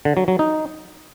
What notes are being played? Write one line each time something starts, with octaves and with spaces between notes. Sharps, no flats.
D3
F#3
F#3
D#4